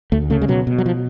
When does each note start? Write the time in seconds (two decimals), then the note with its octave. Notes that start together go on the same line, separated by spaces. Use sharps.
0.12 D2 A3
0.30 C#3 A3
0.42 G#3
0.48 B2 F#3
0.67 B2
0.78 F#3
0.86 F3